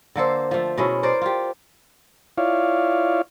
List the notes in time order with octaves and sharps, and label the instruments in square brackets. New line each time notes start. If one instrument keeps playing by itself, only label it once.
[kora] D3 A#3 A4 C5
F3 A3
B2 G#3 C#4 E4
A#4 C5 D5
F4 G4
[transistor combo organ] E4 F4 C#5 D5 F5